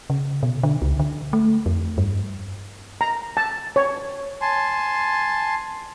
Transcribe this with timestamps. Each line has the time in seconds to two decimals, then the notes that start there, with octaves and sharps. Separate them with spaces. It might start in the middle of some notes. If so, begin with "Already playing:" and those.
0.10 C#3
0.43 B2
0.63 D3
0.82 C#2
0.99 D3
1.33 A3
1.66 F2
1.98 G2
3.01 A#5
3.37 A5
3.76 C#5
4.41 G#5 A5 C6